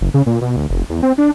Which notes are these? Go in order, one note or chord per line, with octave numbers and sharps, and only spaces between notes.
F#1
C#3
A#2
B2
D2
F1
E2
C4
D4